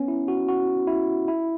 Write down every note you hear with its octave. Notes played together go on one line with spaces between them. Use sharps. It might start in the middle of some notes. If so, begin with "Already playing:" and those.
Already playing: B3 C#4
E4
F#4
F#4
E4
E4